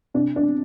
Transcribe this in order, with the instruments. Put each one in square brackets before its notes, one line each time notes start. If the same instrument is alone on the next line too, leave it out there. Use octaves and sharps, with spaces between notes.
[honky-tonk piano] C3 D4
D4